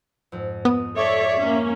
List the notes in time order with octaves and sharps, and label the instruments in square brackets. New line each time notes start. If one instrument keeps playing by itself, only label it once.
[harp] F2 G#2
[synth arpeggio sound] B3 [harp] D#6
[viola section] A4 C#5 D5 [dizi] E5
[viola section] A#3 C#4